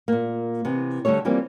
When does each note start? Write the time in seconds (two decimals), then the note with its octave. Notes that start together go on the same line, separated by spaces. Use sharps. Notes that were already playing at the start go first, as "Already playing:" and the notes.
0.08 A#2 A#3
0.65 C3 E3 B3
1.05 D2 D3 G3 A3 A4 C#5
1.25 E3 F3 G3 A#3 C4